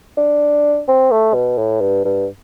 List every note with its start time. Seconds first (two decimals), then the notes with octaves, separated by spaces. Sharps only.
0.17 D4
0.88 C4
1.11 A3
1.34 B2
1.58 A2
1.81 G2
2.05 G2